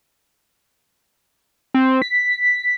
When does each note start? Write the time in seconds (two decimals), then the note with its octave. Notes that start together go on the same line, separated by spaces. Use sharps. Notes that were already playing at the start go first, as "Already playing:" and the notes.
1.74 C4
2.02 B6